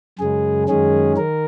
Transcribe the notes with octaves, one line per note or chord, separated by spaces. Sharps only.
F#2 C#3 G#3 G#4
F#2 D#3 G#3 C#4 G#4
D#3 A#4